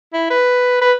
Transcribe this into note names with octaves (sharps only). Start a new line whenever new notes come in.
E4
B4
B4